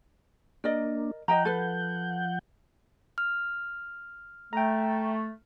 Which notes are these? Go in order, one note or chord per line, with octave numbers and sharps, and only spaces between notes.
A#3 D4 A#4 D5 D#5
F3 D#5 F#5 G5 A#5 G6
A4 B4
F6
A3 G5 A#5